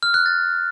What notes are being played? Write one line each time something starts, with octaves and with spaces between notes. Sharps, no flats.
F6
F#6
A6